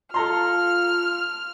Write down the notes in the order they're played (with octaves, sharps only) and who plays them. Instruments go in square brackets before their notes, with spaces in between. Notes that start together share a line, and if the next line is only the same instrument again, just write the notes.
[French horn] F4 [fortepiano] A4 A#5 C6 [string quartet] F6